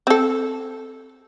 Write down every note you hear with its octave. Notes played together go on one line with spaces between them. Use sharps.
C4 A4